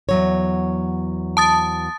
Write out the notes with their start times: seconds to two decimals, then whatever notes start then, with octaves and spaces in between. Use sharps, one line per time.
0.09 E2 F#3 C#5
1.37 A5 D#6 A6